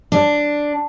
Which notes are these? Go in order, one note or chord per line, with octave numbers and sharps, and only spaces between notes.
D4